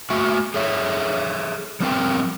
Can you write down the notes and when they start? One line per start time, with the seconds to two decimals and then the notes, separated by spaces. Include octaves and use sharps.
0.10 A3 F#4 E5 G#5
0.54 G#4 A4 C#5 E5
1.80 F3 G3 C4 A#4 G5